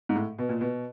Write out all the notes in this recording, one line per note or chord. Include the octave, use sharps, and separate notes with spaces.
G#2
A2
B2
A#2
B2